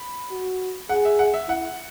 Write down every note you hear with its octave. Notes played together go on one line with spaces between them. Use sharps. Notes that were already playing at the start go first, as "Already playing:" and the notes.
Already playing: B5
F#4
G#4 F#5
E5
F#5
E5
E4 F#5